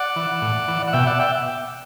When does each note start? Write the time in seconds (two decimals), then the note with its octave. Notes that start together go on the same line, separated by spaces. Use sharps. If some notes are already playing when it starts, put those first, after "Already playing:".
Already playing: D5 F#5
0.16 E3
0.42 A2
0.68 E3
0.88 F#5
0.93 B2 E5 G5
1.07 D5 F#5
1.19 E5 G5